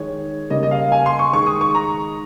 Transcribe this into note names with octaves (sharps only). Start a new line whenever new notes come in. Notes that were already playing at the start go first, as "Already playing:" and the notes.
Already playing: D#3 G#3 C#5
C#3 G3 A#3 D#5
D#5
F5
G#5
C6
C#6
D#3 G#3 C#6
D#6
C#6
A#5